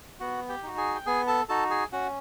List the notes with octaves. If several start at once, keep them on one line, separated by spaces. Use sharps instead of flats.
B3 F#4 F#5
G4 G5
D#4 F#4
G#4 G#5
G5
B3 G#4 G#5
A4 A5
D#4 F#4 A4 A5
G#4 G#5
C#4 F#4 F#5